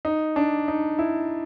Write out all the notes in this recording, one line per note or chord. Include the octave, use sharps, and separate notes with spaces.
D#4
D4
D#4
E4